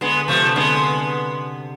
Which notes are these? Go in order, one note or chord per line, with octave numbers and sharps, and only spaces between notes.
D3 G#3 B3
C3 F3 A3
D3 G#3 B3